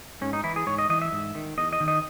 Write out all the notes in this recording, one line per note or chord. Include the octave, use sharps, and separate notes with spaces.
G#2 C#4
D#4
E3 E4
G#4
G#2 C#5
D#5
E3 D#5
E5
G#2
D#3
E2 D#5
D#5
D#3
D#5